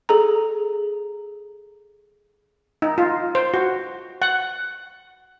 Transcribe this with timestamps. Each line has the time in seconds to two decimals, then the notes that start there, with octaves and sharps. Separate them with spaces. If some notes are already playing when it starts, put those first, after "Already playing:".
0.09 G#4 A4 A#5
2.82 D#4
2.98 F4
3.35 C5
3.54 F#4
4.22 F#5